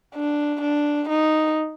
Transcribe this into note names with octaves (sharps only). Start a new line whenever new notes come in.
D4
D4
D#4